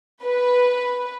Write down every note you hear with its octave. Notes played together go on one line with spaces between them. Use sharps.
B4